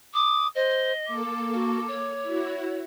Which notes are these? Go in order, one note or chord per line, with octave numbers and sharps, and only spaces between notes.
D6 D#6
C5 D#5
A#3 A4 D6
F#4
C#5
E4 F#4